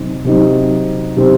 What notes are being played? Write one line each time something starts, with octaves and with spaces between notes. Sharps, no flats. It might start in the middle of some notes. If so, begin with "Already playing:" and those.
Already playing: C3 F#3 C4 D#4
C3 F#3 C4 D#4
C3 F#3 C4 D#4